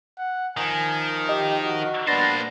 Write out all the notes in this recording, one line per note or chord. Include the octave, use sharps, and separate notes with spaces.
F#5
D#3 F3 A#4 G#5
G4 D#5
F#4
G3 A#3 B3 D4 B4 C5 A6 A#6